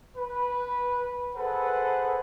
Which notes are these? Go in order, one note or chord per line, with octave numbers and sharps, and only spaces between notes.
B4
G#4 A4 B4 C5 F#5